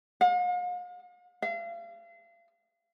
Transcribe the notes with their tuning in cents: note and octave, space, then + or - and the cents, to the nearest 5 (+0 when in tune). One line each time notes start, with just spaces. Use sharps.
F5 +45
F5 -35